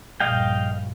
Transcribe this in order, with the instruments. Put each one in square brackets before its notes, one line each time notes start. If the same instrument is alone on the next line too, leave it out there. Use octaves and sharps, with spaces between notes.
[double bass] A#1 G2 [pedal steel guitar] D#5 F5 G5